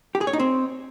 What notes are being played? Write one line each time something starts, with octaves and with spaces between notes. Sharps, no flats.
G4
G#4
C#5
D#4
C4